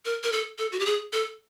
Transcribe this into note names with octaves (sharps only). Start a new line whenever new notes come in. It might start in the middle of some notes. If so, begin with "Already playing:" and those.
A#4
A#4
A4
A4
F#4
G4
G#4
A4